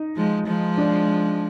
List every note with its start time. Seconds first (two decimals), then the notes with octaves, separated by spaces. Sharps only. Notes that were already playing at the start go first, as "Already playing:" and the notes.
Already playing: D#4
0.16 F3 G#3
0.47 F3 G#3
0.78 D4